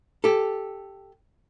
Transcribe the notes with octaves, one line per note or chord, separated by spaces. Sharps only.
G4 A4